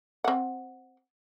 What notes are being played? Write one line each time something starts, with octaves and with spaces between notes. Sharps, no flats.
C4 F#5